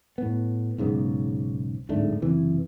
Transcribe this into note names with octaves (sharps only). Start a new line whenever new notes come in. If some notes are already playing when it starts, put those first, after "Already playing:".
A2 B3
B1 G#2 C#3 B3
D1 G#2 A3 D4
F#1 C3 E3